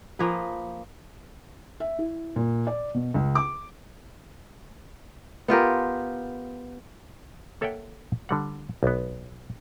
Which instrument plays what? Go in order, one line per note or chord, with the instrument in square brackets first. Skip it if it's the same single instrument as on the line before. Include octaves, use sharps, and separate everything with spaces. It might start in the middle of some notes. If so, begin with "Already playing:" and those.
[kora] F3 A#3 G#4 B4
[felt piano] E5
E4
A#2
D5
B2
C#2
D6
[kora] B3 F4 G4 A#4
[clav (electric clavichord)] A#3 A4 C#5 E5 F#5 G5
D3 G3 F#5
B1 B3